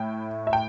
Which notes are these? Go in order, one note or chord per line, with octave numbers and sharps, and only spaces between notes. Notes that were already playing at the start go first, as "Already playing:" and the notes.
Already playing: A2 A3 E4 G5
E5
G5